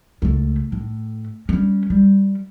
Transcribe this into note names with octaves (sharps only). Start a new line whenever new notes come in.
C#2 A3
A2
G3 C#4
G3